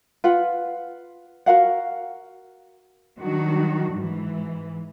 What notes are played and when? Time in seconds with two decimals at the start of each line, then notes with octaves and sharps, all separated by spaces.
0.24 F4 B4 F#5
1.46 F#4 A#4 F5 F#5
3.19 D#3 F#3 G3 D4 F#4
3.95 G#2 E3